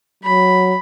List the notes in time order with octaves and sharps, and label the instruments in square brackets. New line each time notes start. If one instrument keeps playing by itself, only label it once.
[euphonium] F#3 [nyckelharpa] B5